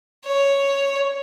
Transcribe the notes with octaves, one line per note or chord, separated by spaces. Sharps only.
C#5